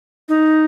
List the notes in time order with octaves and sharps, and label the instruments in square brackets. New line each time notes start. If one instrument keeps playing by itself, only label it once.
[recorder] D#4